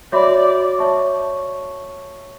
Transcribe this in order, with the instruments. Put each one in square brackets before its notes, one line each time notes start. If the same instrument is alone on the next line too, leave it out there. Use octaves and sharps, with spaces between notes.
[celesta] F#4 C#5 E5 B5 D6 [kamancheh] D5
[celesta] C#5 E5 A5 C#6